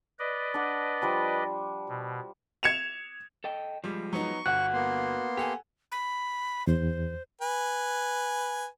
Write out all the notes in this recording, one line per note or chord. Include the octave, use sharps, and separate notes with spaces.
B4 D5 D#5
D4 F#5
F3 G3 D4
B2
G#6 C#7 E7 F7
A4 D#5 G5
F3 G3 G#3
F#3 B3 D#4 C#6
G1 F#4 F#5 F#6
A#3 B3 C6
G4 A4 F#5 G#5
B5
E2 C5
B4 G#5